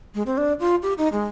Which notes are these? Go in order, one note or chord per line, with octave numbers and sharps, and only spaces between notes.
G#3
C4
D4
F4
G4
D#4
G#3